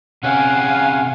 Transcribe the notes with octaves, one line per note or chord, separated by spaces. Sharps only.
C3 C#4 F5 F#5 G#5